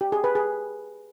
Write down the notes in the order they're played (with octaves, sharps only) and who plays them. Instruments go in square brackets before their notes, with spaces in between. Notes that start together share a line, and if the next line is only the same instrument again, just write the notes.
[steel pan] G4
G#4
B4
G#4